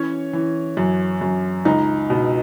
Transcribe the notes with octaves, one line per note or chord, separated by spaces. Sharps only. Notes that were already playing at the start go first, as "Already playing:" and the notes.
Already playing: E3 C#4 C#5
E3
F#2
F#2
C#2 D#4
B2